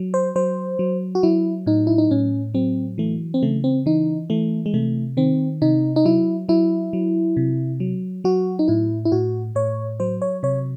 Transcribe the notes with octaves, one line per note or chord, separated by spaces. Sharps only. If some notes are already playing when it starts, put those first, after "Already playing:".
Already playing: F#3
C5
F#3 C5
F#3
F#4
F#3 E4
A2 D#4
E4
D#4
A2 C#4
F#3 C4
E3 A3
C4
C#3 A3
C4
E3 D#4
E3 A3
G#3
C3 A3
D#3 C4
C3 D#4
D#4
F#3 E4
F#3 E4
F#3
C3
F#3
F#3 F#4
D#4
A2 E4
E4
A2 F#4
A2 C#5
F#3 C5
C#5
C3 C#5